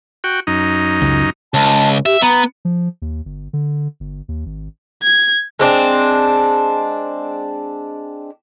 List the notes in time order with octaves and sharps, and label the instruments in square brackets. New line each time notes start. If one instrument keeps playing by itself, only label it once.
[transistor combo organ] F#4 G5
F#2 D#4
[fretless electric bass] C#2
[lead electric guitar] C#2 [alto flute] A5
[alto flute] G4 [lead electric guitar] E5
[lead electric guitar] B3 [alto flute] A#5
[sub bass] F3
D#2
G1
D3
G1
D#2
G#1
[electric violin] G#6
[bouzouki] G#3 C4 D4